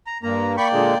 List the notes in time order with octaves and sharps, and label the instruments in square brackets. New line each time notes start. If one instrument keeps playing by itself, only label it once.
[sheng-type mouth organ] A#5
[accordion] G2 A#3 [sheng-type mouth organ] A#5
[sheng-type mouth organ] A#3 D5 G5 [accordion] B5 C#6
[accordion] A#2 D3 G#3